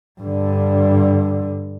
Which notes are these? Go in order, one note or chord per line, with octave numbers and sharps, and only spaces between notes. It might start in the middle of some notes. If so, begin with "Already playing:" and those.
G2 D3